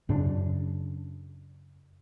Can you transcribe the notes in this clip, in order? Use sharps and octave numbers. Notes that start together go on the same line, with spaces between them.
F#2 C#3 D4